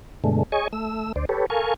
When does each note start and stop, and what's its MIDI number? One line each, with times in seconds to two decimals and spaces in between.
0.24 0.43 43
0.24 0.43 47
0.24 0.43 50
0.24 0.43 56
0.24 0.43 57
0.52 0.68 68
0.52 0.68 73
0.52 0.68 75
0.52 0.68 80
0.52 0.68 85
0.73 1.13 57
0.73 1.13 88
1.16 1.25 38
1.16 1.25 72
1.16 1.25 74
1.29 1.46 67
1.29 1.46 69
1.29 1.46 71
1.29 1.46 73
1.50 1.74 69
1.50 1.74 70
1.50 1.74 77
1.50 1.74 80
1.50 1.74 85